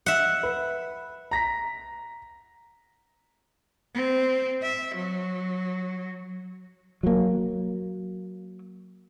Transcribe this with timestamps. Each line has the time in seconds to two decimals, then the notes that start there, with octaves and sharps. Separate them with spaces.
0.06 E5 F#5
0.43 B4
1.31 A#5 A#6 B6
3.95 C4
4.62 E5
4.95 F#3
7.03 F#3 A#3